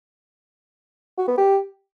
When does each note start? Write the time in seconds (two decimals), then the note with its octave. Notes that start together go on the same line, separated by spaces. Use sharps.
1.18 F#4
1.28 B3
1.37 G4